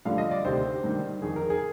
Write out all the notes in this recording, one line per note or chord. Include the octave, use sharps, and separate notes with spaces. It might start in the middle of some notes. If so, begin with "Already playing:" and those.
G2 D3 F3 F5
D#5
D5
D2 C3 D#3 C5
G2 D#3
F2 D#3 G#4
A#4
G#4